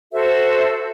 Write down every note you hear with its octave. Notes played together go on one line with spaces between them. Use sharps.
F#4 A4 C5 E5